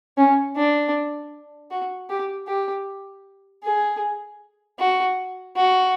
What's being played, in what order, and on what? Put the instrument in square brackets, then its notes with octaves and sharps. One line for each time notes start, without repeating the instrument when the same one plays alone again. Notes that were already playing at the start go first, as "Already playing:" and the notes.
[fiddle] C#4
D4
F#4
G4
G4
G#4
F#4
F#4